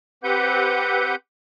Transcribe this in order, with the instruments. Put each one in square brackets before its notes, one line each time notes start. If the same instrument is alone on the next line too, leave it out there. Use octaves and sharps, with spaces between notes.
[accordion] C4 G4 B4 F#5 G6